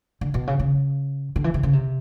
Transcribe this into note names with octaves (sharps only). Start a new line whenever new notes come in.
D3
B2
C#3
C#3
D3
E3
C3
C#3
C3